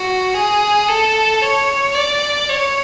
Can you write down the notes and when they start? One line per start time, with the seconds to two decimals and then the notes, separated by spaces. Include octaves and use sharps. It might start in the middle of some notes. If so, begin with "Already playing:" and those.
Already playing: F#4
0.34 G#4
0.88 A4
1.41 C#5
1.94 D5
2.49 C#5